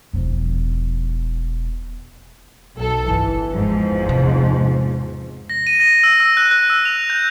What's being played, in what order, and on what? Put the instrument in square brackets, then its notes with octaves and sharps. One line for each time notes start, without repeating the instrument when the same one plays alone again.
[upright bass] E1 F3
[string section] B1 A4
[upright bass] G1 [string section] E3
[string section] E2 G#2 F3
[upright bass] C3
[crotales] A#6
D#7
A#6
E6
E6
F#6
F#6
E6
F7
G6